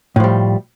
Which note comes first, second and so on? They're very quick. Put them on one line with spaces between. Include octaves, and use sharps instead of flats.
A2 F3 G3